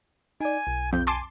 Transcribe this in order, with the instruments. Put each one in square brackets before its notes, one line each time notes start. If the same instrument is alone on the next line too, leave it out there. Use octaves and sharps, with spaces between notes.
[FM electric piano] D#4 D5 [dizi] G#5
[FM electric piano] B1
[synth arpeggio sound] F2 [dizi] G6
[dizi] G#5 [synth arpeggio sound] A5 C6 D6